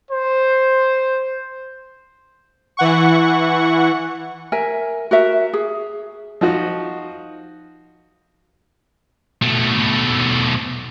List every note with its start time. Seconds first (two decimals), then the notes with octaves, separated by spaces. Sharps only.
0.11 C5
2.77 E3 F#5 C#6
4.52 A#4 E5 G#5
5.11 F#4 A#4 E5
5.53 G#4
6.41 F3 D#4 F4 F#4
9.42 B2 A3